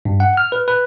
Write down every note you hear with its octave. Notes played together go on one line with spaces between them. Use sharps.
G2
F#5
F6
B4
B4